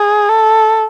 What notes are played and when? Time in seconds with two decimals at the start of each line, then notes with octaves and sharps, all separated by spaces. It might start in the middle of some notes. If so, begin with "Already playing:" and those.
Already playing: G#4
0.29 A4